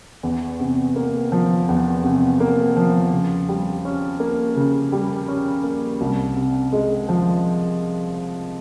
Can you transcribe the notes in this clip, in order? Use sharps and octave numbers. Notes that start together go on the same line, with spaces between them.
E2
C3
A#3
F3
E2
C3
A#3
F3
C#3
G3
C#4
A#3
C#3
G3
C#4
A#3
C2
C3
G#3
F3